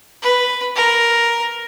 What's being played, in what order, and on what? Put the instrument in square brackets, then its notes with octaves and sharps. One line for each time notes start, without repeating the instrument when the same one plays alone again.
[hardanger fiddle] B4
A#4